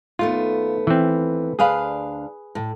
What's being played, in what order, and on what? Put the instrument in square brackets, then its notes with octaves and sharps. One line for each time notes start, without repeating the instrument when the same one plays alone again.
[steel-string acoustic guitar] D#2 A3 B3 [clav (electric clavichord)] F4
[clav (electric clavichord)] E3 C4
[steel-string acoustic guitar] D2 D4 F5 [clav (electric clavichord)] G#4 B4
[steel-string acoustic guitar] A2